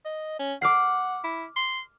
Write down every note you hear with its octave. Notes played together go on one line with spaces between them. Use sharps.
D#5
C#4
F#5 D6 F6 C7
E4
C6